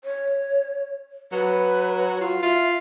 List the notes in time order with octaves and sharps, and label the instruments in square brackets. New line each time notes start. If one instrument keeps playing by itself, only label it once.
[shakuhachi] C#5
[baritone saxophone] F#3 [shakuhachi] B4
[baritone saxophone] F4 [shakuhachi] F#4
[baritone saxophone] F4 [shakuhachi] E5